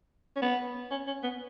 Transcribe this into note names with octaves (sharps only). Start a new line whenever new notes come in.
C#4
B3
C#4
C#4
B3